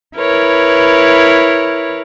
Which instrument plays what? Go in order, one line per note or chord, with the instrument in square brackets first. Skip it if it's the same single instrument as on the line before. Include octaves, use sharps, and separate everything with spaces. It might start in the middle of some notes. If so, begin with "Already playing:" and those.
[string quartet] E4 A#4 B4 C#5